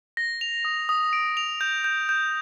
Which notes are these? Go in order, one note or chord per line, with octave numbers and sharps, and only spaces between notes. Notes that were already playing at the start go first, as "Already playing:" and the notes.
A#6
F7
D#6
D#6
D7
F7
G6
G6
G6